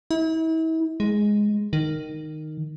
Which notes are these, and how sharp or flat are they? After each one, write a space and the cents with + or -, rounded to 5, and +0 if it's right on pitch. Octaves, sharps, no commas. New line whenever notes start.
E4 -40
G#3 +0
D#3 -10